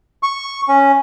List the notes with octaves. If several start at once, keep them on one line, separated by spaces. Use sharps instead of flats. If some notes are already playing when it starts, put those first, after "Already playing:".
C#6
C#4